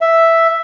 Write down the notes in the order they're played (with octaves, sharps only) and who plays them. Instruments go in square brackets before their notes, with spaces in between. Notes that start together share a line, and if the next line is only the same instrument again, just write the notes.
[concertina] E5